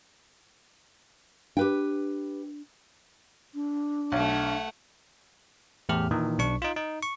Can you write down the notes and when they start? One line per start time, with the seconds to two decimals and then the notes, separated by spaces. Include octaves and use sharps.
1.57 D4 G4 B4 G5
3.54 D4
4.12 B1 A3 F#5
5.89 E2 A2 G4 F6
6.11 A#2 D#3 E3
6.38 B1 D4 C#6
6.62 D#4 F4
6.76 D#4
7.02 C#6